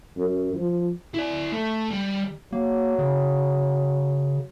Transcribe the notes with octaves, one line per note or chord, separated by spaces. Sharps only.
F#2
F3
E4 D5
A3
G3
F#3 A#3
C#3